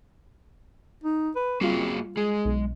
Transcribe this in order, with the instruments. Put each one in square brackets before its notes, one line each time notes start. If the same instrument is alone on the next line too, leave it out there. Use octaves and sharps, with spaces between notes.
[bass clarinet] D#4
B4
[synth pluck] G3 F4 [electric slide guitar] A#3 F#4 G#4 [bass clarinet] C4
[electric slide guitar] G#3 [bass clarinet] G#4
[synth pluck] B1